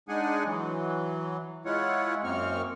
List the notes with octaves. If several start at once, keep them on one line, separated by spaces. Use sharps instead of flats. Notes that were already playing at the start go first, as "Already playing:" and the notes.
G#3 D4 D#4 G#4 F#5 G#5
E3 F#3
G#3 E4 F4 C#5 F#5
F#2 A#3 C4 C#6 F6